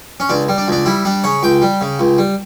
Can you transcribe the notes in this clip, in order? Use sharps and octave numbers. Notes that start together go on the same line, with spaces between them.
C#4
C#2 D4
G3
D4
C#2 D4
G3 E4
G3 D4
C#3 C#5
C#2 G5
G3
C#3
C#2
G3